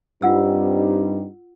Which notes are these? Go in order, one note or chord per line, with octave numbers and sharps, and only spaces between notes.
G2 G3 C4 D#4 F4 F#5 E6